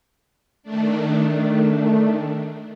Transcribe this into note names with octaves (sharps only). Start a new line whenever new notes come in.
D#3 A3 D4